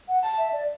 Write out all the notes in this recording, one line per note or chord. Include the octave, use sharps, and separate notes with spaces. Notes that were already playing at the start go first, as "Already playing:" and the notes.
F#5
A5
E5
D5